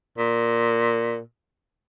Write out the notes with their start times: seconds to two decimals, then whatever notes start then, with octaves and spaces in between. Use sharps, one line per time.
0.18 A#2